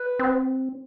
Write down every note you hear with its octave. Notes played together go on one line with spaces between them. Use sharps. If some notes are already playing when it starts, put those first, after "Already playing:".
Already playing: B4
C4